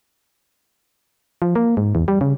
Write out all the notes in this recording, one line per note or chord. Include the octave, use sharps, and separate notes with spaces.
F3
A#3
G#2
E2
G3
C#3